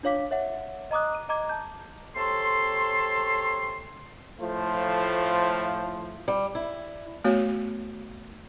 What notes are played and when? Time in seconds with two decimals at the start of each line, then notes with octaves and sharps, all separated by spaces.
0.03 D4 F4 C#5 F5 D6 B6
0.31 C#5 E5 F#5
0.91 D#5 A#5 D6 D#6 F#6
1.15 D#7
1.29 D#5 A#5 D6 G#6
1.49 A5 G6
2.16 C3 A4 C#5 C6
4.40 A2 F3 A3 F4 C5
6.28 G3
6.55 E4
7.24 A3 B3 F#4 C#5